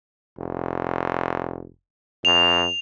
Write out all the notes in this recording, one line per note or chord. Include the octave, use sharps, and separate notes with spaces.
F1
F2 F7